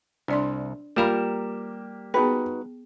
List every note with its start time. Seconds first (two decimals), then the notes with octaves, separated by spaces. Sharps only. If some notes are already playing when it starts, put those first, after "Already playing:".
0.28 C2 D4 D5 C6
0.96 G3 A#3 F4 G4 A#4 F5 B5 E7
2.14 B3 D#4 F#4 G#4 B4 G5